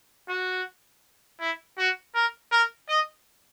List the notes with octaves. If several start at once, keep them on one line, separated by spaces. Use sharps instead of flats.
F#4
E4
F#4
A#4
A#4
D#5